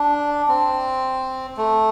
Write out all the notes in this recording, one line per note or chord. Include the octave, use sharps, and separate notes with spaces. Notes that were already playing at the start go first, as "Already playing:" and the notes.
Already playing: D4
C4
A3